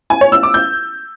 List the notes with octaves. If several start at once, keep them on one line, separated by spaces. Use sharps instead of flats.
G#5
C#5
E6
D6
G6